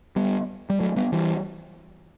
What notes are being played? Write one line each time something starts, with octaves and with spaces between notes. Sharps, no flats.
G3 B3
G3
F#3 A3
G3 B3
E3 G3